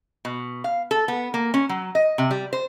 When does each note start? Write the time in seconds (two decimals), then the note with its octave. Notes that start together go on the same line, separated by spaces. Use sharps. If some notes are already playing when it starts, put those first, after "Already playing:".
0.25 B2
0.64 F5
0.91 A4
1.08 B3
1.34 A#3
1.54 C#4
1.69 F#3
1.95 D#5
2.18 C3
2.31 G3
2.53 C5